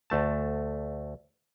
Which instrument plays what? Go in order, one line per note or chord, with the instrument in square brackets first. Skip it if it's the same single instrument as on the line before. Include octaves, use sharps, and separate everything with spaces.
[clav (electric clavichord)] D2 A3 A5